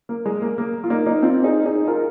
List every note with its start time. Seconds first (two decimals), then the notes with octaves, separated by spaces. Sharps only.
0.09 A#3
0.26 G#3
0.42 A#3
0.58 A#3
0.84 F4
0.90 A#3 D#4
1.06 A#3 D#4
1.23 C4 F4
1.44 D#4 G#4
1.66 D#4 G#4
1.88 F4 A#4